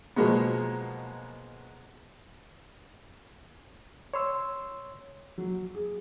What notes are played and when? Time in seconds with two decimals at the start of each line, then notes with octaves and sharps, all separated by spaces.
0.16 B2 F3 F#3 G#3 A#3 B3
4.14 C#5 C6 E6
5.38 F#3
5.75 G#4